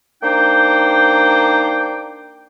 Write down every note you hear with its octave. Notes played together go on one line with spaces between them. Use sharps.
A#3 D4 D#4 C5 G5